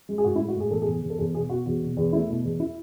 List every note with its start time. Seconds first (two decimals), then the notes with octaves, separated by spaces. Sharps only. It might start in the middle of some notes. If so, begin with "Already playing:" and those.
0.09 G#3
0.18 G#4
0.24 A2 F#4
0.35 E4
0.40 G#3
0.48 F#4
0.56 A2 G#4
0.71 E2 A4
0.82 G#4
0.87 E2
1.02 E2
1.10 A4
1.18 E2 G#4
1.35 B2 G#4
1.50 B2 F#4
1.66 E2 F#4
1.82 B2
1.97 E2
2.13 A3 E4
2.29 B2
2.44 E2
2.60 E4